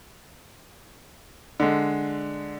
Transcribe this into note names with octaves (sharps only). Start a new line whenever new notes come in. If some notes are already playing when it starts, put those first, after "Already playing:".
D3 G#3